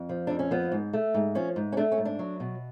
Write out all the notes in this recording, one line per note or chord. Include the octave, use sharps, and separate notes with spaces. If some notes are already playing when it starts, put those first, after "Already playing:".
Already playing: F2
F3
F2 D4
C#4
F3 B3
G#2
A3
G#2
F3 C#4
G#2
C#4
A3 D4
C#4
G#2
D4
F#3
B2